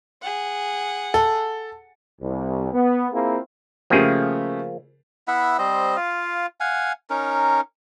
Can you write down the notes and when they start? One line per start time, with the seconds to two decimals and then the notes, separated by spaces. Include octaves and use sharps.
0.22 G#4 F#5
1.14 A4
2.21 C2
2.73 B3
3.12 A#3 C4 E4 F4 G#4
3.90 C#3 F3 A3 A#3 G4 G#4
5.28 B3 E4 E5 F#5
5.59 G3 C4 C5 D#5
5.96 F4 F5
6.60 F5 F#5 G#5
7.10 C#4 D#4 A#4